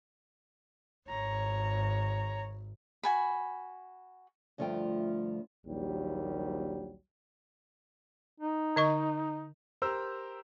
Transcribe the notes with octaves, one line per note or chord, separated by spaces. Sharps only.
G#1 C#5 A#5
F#4 G#5 B5
D2 G2 F3 A3 F4 G5
A#1 D#2 F#3 G3
D#4
D3 D#5 C#6
G4 A#4 C5 A#5 E6